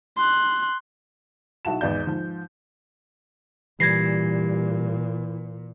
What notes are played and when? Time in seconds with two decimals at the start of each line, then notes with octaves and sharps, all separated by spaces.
0.17 C6 F#6
1.65 B1 E4 F#4 A5 E7
1.81 G#1 E2 D5 G6
2.07 G#2 F3
3.80 A#2 E3 G3 G#6 A#6 C7